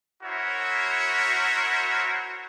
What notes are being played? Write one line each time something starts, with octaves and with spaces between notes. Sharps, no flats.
E4 F#4 A#4 C5 C#5 E5